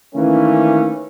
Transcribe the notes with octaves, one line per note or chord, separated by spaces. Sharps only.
D#3 E3 A3 A#3 C#4